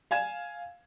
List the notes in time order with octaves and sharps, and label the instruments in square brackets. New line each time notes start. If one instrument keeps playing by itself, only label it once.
[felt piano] F5 G#5 G#6 E7